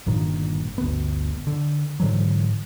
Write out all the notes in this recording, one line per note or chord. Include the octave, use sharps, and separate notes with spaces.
G1 G2 A#2 D#3
G1 D2 B3
D3
G#2 D3 E3 F#3